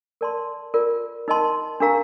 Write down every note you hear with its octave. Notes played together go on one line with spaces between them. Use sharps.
A#4 D5 A5 C6
F4 A#4 D5
D#4 A#4 D#5 A5 C6
D4 G4 A#4 F5 A#5